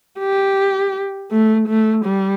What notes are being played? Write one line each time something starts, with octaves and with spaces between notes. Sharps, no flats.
G4
A3
A3
G3